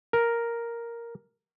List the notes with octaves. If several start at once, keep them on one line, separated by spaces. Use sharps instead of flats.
A#4